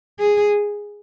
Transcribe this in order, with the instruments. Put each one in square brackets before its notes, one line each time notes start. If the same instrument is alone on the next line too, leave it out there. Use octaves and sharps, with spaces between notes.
[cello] G#4